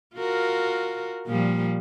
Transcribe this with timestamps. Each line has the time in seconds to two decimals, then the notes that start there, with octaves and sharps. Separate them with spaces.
0.16 F4 F#4 A#4
1.27 A#2 F3 G3